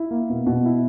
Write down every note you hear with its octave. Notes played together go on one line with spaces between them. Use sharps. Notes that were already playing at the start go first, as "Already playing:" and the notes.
Already playing: E4
A#3
B2
B2
E4